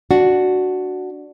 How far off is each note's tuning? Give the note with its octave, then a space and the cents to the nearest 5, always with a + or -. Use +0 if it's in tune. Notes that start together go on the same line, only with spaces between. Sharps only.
D4 +0 F#4 +0